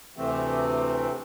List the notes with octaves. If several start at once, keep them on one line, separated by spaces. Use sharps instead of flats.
D2 C3 E3 A3 C4